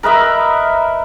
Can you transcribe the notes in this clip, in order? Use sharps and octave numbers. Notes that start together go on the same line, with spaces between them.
A#4 B4 D#5 E5